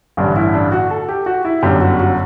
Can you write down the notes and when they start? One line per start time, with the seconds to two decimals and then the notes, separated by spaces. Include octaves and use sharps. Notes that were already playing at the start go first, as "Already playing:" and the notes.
0.17 A1 G2 D3 D4
0.36 E4
0.54 D4
0.72 F#4
0.90 A4
1.09 G4
1.26 F#4
1.45 E4
1.62 G1 F#2 D3 G4
1.81 F#4
2.00 F#4